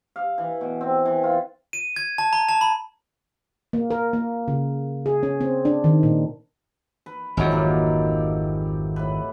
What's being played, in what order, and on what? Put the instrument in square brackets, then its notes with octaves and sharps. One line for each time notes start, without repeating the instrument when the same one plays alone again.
[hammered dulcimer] F5
E3
B2
C4
E3
F4
[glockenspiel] D#7
G#6
A5
A#5
A5
B5
[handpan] A#3
A#4
A#3
C#3
G#4
C#4
C4
D4
D#3
A#2
[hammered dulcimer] B4
[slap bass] G#1 F2 [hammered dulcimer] D#3 E3 F#3
[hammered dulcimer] A#3 G4 A4
A2 B4